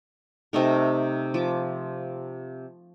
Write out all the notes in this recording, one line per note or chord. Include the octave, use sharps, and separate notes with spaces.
C3 A3 D#4 A#4
F3 D6